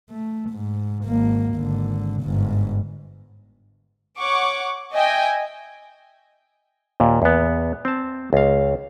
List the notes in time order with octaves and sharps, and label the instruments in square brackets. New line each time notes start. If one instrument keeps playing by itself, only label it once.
[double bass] A3
G#2
G#1 A#3
G#1 D3
G1 G#2
[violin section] C#5 F#5 C#6 D6
D#5 E5 G5 G#5
[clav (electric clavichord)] D#2 A#2
E2 B3
C4 A5
C#2 F5